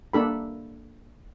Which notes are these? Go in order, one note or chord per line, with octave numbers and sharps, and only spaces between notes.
A#3 D4 A4 B5